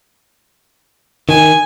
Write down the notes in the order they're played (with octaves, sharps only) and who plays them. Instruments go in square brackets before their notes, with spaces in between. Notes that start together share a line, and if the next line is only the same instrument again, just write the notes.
[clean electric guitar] D#3 [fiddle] G#5